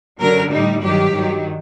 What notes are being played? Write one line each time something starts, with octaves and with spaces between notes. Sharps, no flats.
F#2 D3 F#3 A#4
A2 G3 D#4
G2 D#3 F#3 G4
G2 D#3 F#3